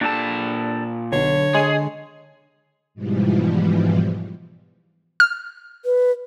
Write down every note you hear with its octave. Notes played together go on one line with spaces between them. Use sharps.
A#2 D4 G4 A4 A5
B1 D3 C#5
G#3 G#4 C7
G#2 B2 E3 F3 G3
F6
B4